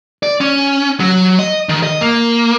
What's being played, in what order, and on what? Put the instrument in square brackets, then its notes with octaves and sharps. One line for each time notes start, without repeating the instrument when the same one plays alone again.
[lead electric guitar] D5
C#4
F#3
D#5
D#3
D#5
A#3